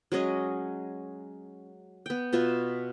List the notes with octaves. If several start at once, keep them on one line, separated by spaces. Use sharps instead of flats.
F#3 G#3 C#4 D#5
B3 G5
B2 F4 B4 E5